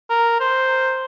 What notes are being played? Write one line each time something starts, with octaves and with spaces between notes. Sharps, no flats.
A#4
C5